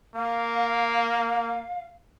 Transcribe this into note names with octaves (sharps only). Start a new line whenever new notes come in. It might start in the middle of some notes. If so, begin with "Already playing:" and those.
A#3 F5